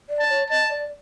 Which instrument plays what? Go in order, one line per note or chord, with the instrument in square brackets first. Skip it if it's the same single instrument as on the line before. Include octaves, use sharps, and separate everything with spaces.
[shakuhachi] D5
[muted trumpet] A5
[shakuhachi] C#5
[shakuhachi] D#5 [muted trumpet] A5
[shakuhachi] D5